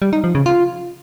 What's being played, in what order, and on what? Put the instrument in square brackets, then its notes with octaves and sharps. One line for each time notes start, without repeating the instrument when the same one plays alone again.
[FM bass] G3
D#4
F3
C#3
F4